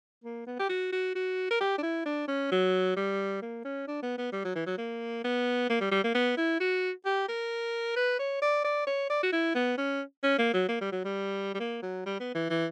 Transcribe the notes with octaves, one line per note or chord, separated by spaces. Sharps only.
A#3
B3
G4
F#4
F#4
F#4
A#4
G4
D4
E4
D4
C#4
F#3
G3
A#3
C#4
D4
B3
B3
G3
F#3
E3
F#3
A#3
B3
A#3
G3
G3
A#3
B3
E4
F#4
G4
A#4
B4
C#5
D5
D5
C#5
D5
F#4
E4
B3
C#4
C#4
A#3
F#3
A#3
G3
F#3
G3
G3
A#3
F#3
G3
B3
E3
E3